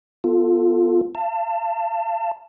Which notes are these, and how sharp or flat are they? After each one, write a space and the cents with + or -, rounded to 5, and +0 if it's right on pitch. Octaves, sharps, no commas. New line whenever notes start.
B3 +0 F4 +5 A4 +5
F5 -35 A5 +25